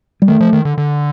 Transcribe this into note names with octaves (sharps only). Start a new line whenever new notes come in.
G3
D#3 A3
F3
D#3
D3
D3